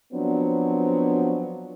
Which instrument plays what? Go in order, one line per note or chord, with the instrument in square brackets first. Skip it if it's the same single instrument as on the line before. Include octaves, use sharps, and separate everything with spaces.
[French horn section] F3 F#3 B3 C4 D4